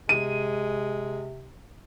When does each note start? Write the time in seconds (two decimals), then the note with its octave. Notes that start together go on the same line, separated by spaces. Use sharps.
0.09 C3 G#3 D#7